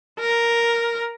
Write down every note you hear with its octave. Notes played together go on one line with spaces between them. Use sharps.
A#4